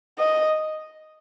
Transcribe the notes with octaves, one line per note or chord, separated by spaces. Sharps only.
D#5